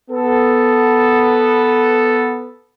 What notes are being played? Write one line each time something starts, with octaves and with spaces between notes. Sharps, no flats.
B3 A4